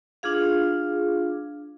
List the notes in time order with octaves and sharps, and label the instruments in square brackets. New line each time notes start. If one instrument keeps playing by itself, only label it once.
[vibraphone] D4 F4 G#4 F5